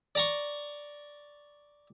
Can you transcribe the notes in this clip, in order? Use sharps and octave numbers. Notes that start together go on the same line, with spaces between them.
D5 A#5 C#6